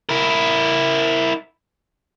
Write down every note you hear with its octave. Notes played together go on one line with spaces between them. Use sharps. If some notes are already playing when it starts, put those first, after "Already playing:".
E4 A#4